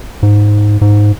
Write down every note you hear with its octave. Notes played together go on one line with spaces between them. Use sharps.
G#2
G#2